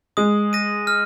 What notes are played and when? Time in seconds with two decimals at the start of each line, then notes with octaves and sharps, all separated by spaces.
0.17 G#3 D#6
0.53 A#6 D#7
0.87 F6